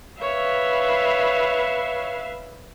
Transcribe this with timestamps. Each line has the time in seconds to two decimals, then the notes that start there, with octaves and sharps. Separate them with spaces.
0.21 B4 C#5 E5 F5